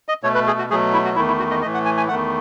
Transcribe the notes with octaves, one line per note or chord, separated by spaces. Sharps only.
D#5
B2 A3 C#5
B4
G#4
F#4
B2 F#3 A3 G#4
E4
F#4
E2 D#3 A3 E4
E4
F#4
D#5
A2 E3 A3 D#5
F#5
G#5
G#5
E2 D#3 A3 F#5